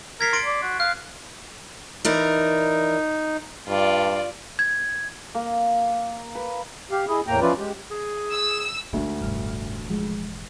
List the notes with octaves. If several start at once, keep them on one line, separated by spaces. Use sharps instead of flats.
A#4 G#6 B6 C7
C6 A6 D7
D5
F#4
F5 F#6
E3 D#4 A#4 D5
G2 F4 D5
G#6
A#3
B4
G4 F5
E4 G#4 D#5
E2 A2 A#3 G5 A#5
F3 C#4 E4 F4 B4 D5
G#3 G4
G#4
E6
D2 D3 G#3 D#4
E1 A1 G2 F6
F3 G#3